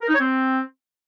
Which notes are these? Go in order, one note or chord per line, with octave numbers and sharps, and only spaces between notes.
A#4
D#4
C#5
C4